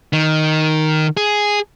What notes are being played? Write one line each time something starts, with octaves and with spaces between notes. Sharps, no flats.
D#3
G#4